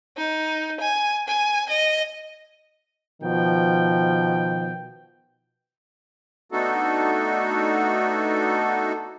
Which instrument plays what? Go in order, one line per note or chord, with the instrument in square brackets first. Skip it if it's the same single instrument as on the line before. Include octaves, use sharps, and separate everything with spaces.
[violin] D#4
G#5
G#5
D#5
[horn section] B2 D#3 F3 G5
[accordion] A3 B3 D4 D#4 F#4 A4